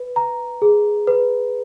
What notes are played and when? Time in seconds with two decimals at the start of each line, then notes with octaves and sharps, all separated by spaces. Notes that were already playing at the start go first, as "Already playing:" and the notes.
Already playing: B4
0.16 A#5
0.62 G#4
1.07 B4